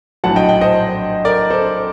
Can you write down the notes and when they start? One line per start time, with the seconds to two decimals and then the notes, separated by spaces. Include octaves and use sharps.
0.24 A#1 A2 F#3 F#5 A5
0.36 D#5 G5
0.49 D#5 G5
0.61 C5 D#5
1.25 A#4 D5
1.50 A4 C5